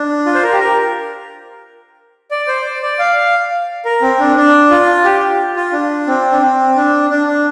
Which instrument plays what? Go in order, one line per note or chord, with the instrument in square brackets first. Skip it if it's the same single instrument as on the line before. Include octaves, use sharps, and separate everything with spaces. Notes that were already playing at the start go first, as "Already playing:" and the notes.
Already playing: [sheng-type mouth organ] D4
F4
C5
A#4
G4
A#4
D5
C5
D5
D5
F5
A#4
C4
D4
D4
F4
G4
F4
D4
C4
D4
C4
D4
D4
D4